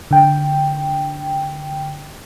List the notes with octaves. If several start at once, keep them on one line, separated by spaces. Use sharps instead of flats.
D3 G5